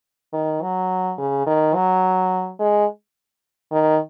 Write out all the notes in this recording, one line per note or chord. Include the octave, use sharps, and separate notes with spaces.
D#3
F#3
C#3
D#3
F#3
G#3
D#3